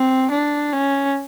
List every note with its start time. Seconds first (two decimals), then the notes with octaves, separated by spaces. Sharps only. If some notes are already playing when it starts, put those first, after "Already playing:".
Already playing: C4
0.31 D4
0.73 C#4